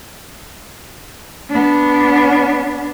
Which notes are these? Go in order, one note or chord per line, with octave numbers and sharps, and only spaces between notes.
B3 D4